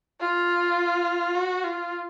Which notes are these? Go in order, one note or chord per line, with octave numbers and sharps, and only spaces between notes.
F4
F#4
F4